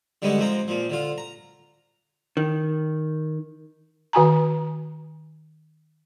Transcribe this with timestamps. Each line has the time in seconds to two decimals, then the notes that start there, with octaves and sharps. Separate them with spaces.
0.22 D3 G3 G#3 B3 C#4
0.38 F3 G#3 C4 A#5
0.68 A#2 F3
0.90 D3 F4
1.18 A#5
2.37 D#3
4.13 D#3 F#4 G#5 A#5